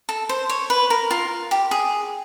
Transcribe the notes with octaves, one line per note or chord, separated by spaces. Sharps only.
A4
C5
C#5
B4
A#4
F4
G4
G#4